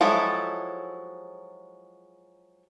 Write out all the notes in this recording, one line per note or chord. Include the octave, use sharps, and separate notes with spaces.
F3 F#3 G#3 E4 A4